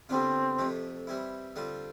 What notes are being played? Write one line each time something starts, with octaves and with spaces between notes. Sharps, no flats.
D3 G3 B3 C4 D4 F4
F2 C3 F3 A3
E3 G3 C4 E4
D3 G3 C4 F4